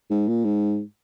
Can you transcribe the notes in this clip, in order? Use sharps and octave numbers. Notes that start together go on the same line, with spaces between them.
G#2
A#2
G#2